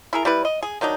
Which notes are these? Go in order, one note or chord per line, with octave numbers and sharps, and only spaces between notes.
E4 G#4 A#4
G3 E4 B4
D#5
G#4
D#3 F#3 D4 D#4